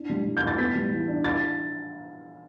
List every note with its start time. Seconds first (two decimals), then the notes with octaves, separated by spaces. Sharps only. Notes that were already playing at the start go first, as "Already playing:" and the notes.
Already playing: D4 E4
0.09 G3
0.26 A2
0.37 G6
0.42 A2
0.47 A6
0.58 B3 B6
0.75 G3
0.92 E3
1.08 D4
1.24 E4 A6